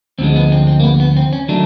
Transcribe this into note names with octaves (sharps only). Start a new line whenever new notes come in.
D2 D3 F3 G#3 C4
B3
C4
C4
A#3
B3
B3
C4
C#4
D#3 F#3 A3 D4